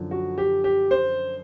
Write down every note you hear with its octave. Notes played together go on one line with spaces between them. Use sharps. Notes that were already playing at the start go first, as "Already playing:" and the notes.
Already playing: F#2 D3 F3
F#4
G4
G4
C5